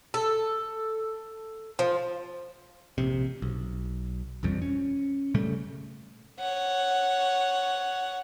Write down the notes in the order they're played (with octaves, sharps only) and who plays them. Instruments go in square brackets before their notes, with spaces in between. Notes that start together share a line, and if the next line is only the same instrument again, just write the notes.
[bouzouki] A4
F3
[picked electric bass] A#1 C3
B1
E1 A#1 F2 G3
C#4
A#2 C#3 G3 A3
[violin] C#5 F#5